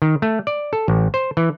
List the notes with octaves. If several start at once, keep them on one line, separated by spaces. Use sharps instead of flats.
D#3
A3
D5
A4
A1
C5
E3